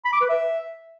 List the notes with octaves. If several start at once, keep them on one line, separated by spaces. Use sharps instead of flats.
B5
D6
B4
E5